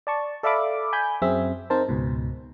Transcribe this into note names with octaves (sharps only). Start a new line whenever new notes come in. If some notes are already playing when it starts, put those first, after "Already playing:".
D5 A5 C#6
A4 D5 E5 F5 B5 D6
G#5 B5 G6
F#2 C4 G#4 E5
C4 D#4 A#4 C5 A5
C#2 G#2 B2